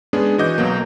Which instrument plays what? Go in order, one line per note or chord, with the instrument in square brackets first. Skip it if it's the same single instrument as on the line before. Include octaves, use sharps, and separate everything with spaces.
[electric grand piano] G#3 B3 C#4 D4 G#4
E3 F#4 D#5 D6 G6
B1 B2 F#3 A#3